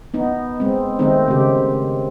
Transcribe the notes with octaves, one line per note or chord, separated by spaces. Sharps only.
B3 D#4
G#3 C4
D#3 G#3 A3 C4 D#4
C#3 G4